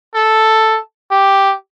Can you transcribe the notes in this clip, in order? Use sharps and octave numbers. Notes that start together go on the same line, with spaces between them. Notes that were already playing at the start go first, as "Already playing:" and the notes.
A4
G4